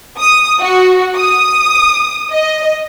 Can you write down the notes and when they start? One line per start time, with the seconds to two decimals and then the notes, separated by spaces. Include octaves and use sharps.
0.19 D#6
0.61 F#4
1.16 D#6
2.32 D#5